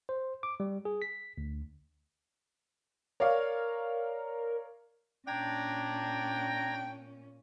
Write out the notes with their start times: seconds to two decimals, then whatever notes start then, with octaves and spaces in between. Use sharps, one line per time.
0.09 C5
0.43 D6
0.60 G3
0.85 G#4
1.02 B6
1.38 D2
3.20 A#4 C#5 D5 F5
5.27 A#2 C#4 D4 G5 A#5 G#6 A#6